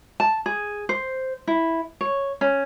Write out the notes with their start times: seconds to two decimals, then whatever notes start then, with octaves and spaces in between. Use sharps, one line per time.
0.20 A5
0.46 G#4
0.89 C5
1.47 E4
2.01 C#5
2.41 C#4